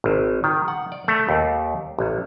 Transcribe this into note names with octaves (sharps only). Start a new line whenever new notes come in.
G#1
D#3
F#5
D5
A3
D#2
A1